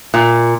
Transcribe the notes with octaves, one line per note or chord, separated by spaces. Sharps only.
A#2